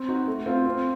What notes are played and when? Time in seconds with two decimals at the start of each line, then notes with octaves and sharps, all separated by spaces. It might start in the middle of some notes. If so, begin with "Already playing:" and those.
Already playing: C4
0.08 D#4 F#4
0.27 A3
0.46 C4 F4
0.66 C4